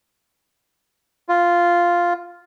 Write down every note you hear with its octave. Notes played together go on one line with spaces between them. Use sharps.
F4